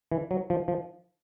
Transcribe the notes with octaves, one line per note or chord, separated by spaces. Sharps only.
E3
F#3
F3
F3